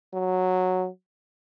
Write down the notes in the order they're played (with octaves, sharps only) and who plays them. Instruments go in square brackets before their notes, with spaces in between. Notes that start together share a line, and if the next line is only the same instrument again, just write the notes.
[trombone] F#3